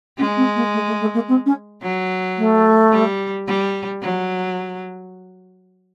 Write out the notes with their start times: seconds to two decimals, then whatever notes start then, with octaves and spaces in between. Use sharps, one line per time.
0.18 G#3 C#4
0.36 C4
0.55 A#3
0.73 A3
0.87 A3
1.00 A3
1.14 A#3
1.28 C4
1.45 C#4
1.83 F#3
2.37 A3
2.92 G3
3.47 G3
4.02 F#3